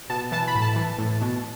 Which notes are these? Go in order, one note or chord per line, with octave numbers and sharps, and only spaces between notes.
B2 A5
E3 A5
B5
A2
A5
E3
A2
B2